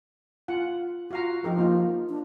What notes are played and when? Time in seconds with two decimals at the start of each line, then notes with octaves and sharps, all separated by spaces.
0.48 F4 F#5
1.11 F4 F#4 F5 A#5
1.44 F3 D#4 G4 A#4
1.58 A#3 F4
2.09 D4